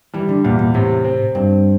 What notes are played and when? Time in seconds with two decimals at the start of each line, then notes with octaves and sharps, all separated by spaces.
0.14 E3 G3
0.29 D3
0.44 E2 A#2
0.59 A#2
0.74 A2 C3
1.04 C4
1.35 G2 C4